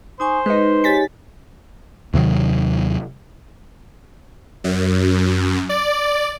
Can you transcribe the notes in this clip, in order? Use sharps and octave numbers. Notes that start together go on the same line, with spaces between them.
D#4 C5 G#5 C#6
G#3 D#4 B4
G4 C#5 G#5 A6 B6
D#2 C3 D#3 F#3
F#2
D5